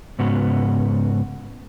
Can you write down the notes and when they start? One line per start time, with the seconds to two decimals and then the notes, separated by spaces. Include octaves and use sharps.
0.19 G#2 C#3 B3 F#4